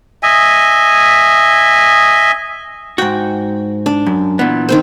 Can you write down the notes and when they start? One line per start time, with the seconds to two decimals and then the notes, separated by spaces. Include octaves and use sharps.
0.23 D#5 E5 G#5
2.98 G#2 F#4 G5
3.86 D4
4.06 F#2
4.39 A#2 E3 B3
4.69 D#3 C4 C5